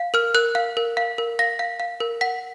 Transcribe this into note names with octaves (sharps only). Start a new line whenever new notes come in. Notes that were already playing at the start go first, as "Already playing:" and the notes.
Already playing: F5
A#4 F6
A#4 F#6
F5
A#4
F5
A#4
F5 A#6
F5
F5
A#4
F#5 B6